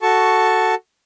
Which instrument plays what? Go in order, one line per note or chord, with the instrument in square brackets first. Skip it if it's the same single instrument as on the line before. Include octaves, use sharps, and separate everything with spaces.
[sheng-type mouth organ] F#4 A4 A5 C#6